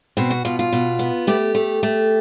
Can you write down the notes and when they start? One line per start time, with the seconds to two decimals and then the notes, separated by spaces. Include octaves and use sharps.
0.17 B2 C4
0.30 F#4
0.45 B2 F4
0.59 F4
0.72 B2
0.99 B3
1.27 A3 G4
1.54 A3
1.83 A3